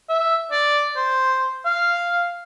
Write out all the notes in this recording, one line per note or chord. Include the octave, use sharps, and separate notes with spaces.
E5
D5
C5
F5